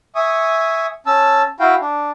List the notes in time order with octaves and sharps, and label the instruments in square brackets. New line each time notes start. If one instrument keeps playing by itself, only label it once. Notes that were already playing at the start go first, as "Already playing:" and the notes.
[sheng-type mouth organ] E5 G#5 C#6 D#6
C#4 A5 E6
E4 F#4 F5 G5
D4